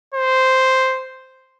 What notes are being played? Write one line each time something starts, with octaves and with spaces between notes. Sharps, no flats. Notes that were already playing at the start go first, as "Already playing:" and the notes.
C5